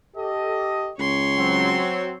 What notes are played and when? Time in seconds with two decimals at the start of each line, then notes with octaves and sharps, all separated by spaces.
0.17 G4 A4 D#5
0.98 C#2 C#5 C6
1.37 F#3 C4